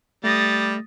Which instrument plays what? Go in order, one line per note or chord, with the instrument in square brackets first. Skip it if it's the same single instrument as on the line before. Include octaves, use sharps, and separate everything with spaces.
[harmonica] G3 [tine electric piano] A3 A#6 [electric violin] D#6 A6